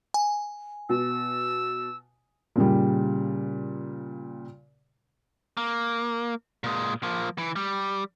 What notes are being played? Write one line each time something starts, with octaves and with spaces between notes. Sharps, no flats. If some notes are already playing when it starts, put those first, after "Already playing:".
G#5
B2 E6
A#2 C#3 G3
A#3
A#2 G#3
F3 A#3
E3
G3